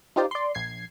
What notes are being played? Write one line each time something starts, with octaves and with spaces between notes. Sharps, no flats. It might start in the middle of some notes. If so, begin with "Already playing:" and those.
D#4 F4 G4 C5 D5
D5 C6
A#1 G#6 C7